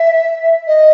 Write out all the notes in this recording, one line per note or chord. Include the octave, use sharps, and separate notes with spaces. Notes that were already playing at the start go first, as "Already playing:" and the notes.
Already playing: E5
D#5